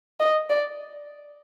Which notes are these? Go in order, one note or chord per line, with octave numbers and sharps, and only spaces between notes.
D#5
D5